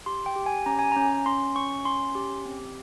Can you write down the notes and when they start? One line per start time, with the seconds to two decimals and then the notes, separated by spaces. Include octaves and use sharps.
0.06 G4 C6
0.26 G5
0.36 G4
0.46 G#5
0.66 C#4 A#5
0.79 G#5
0.92 C#4 A#5
1.26 C#4 C6
1.56 C#4 C#6
1.85 C#4 C6
2.15 G4
2.45 C4